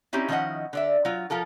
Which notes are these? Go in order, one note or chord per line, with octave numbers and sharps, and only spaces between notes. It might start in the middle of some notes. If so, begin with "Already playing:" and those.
C4 C#4 D#4 E4 G4
D#3 F3 C#4 E4 D#5 F#5
D3 D5 E5
F#3 F4
F3 F4 A4 A#4